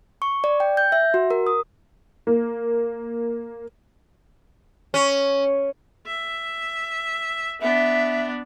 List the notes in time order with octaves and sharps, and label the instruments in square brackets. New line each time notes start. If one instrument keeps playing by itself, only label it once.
[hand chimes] C#6
D5
G5
G6
E5
F#4
A#4
D#6
[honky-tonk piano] A#3
[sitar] C#4
[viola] E5
[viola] B3 D4 [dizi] E5